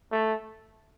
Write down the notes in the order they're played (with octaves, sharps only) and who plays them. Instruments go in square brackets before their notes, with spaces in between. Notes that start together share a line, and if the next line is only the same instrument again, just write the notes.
[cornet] A3